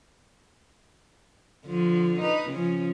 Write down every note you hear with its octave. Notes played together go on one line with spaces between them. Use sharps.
D3 F3
D#4 B4
C#3 F3 C#4